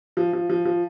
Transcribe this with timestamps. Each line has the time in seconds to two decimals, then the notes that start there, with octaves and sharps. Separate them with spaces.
0.17 F3
0.33 F3
0.49 F3
0.65 F3